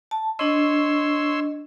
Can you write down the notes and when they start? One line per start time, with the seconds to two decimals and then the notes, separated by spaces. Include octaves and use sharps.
0.11 A5
0.39 D4 C#5 D#5 C6 E6